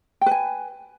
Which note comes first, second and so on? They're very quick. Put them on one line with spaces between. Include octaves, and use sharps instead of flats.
G5 B4 G#5